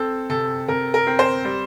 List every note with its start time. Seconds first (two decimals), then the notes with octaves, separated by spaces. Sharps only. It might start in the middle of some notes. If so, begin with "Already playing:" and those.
Already playing: C4 A4
0.30 C3 A4
0.68 C3 A#4
0.94 A#4
1.07 C4
1.19 C5
1.45 G3